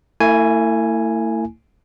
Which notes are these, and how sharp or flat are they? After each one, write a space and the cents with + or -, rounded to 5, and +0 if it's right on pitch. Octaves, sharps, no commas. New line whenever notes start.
A3 +45 E4 +0 G#5 +0